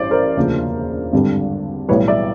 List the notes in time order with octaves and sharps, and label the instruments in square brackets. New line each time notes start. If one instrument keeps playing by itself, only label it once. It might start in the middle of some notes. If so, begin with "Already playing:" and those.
Already playing: [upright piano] A1 G2 E3 C5 D5
A#4 C5
E1 D2 C#3 F3 A#3
G#1 G2 D3 G3
B1 A2 E3 G3 B4 C#5
D5 E5